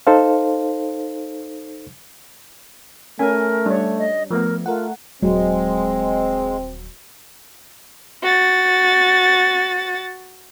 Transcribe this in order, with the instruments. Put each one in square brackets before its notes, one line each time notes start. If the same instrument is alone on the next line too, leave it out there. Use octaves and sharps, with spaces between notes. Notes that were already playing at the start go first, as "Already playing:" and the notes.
[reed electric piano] D#4 A4 C5 F5
[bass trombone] A3 [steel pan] C#4 G#5 [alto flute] A#4
[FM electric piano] G3 [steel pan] D4 C#5
[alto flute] D#5
[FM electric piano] F3 A3 B3 [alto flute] A#4
[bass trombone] A3 [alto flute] F4 [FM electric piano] A#4 F#5
[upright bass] D#1 [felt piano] F#3 [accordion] G#3 [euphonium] C4
[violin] F#4 A6